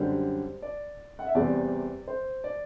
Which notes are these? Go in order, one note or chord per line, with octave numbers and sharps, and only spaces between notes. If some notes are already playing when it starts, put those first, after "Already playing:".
Already playing: F#2 D3 G3 C5
D5
F#5
E5
E2 C3 G3 C4 D5
C5
D5